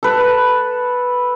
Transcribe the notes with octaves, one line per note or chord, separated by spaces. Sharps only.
A4 B4